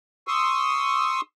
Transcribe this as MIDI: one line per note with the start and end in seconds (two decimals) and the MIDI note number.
0.28 1.21 84
0.28 1.21 85
0.28 1.21 87
0.28 1.21 88